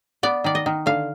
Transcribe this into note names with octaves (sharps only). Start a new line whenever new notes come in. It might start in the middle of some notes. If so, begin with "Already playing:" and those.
B3 D5
D#3 D5
D#5
D#3
D3 F5